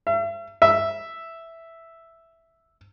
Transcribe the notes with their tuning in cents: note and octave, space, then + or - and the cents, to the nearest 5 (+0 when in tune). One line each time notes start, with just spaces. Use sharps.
E5 +40
E5 +0